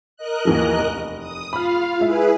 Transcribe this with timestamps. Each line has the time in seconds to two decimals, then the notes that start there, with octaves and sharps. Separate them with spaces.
0.17 A#4 D#5 F#6
0.45 D#2 E3 F3
0.78 F1
1.19 D#6
1.53 F4 F5 B5 F6
2.00 G#3 E4 G#4 B4 E5